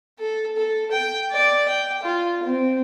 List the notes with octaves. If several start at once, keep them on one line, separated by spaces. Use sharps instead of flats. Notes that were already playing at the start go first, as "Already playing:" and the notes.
A4
A4
G5
D5
G5
F4
C4